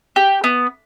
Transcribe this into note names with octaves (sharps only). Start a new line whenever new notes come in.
G4
B3